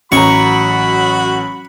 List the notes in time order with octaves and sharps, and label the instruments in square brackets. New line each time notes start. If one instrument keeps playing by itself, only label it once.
[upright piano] A1 A#5 [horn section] F#3 B5 [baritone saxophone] F#4 [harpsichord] C#6